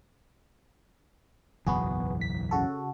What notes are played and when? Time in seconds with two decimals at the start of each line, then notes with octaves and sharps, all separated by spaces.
1.66 F#1 B1 E2 B3 F#4 G#4
2.21 B6
2.51 C#3 F#4 A4